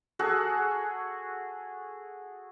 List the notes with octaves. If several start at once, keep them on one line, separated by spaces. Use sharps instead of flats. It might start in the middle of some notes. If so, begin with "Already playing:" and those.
F#4 G#4 A4 F#5